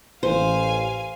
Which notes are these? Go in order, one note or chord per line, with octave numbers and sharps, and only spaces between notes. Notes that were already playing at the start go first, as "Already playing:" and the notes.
A1 C5 F5 G#5